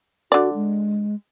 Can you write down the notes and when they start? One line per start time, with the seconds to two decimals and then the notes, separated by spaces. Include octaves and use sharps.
0.32 D3 F#4 D5
0.55 G#3